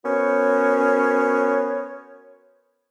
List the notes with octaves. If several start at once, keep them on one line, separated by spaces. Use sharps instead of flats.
B3 C#4 F#4 A#4 C5 C#5